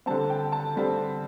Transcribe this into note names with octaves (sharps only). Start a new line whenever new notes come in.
D3 G3 C4 A5
G5
A5
D3 G3 C4